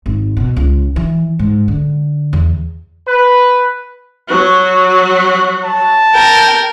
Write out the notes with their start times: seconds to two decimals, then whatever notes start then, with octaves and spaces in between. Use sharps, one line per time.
0.06 G#1
0.37 B2
0.57 C#2
0.96 E3
1.39 G#2
1.68 D3
2.33 E2
3.07 B4
4.29 F#3 F#4
5.64 A5
6.14 A#4 G5